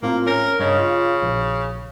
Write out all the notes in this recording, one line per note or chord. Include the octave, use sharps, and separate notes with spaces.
A2 A#3 C4 F4
C#4 A#4 A#6
G2 C#3 C#5 D#5
F4
A#1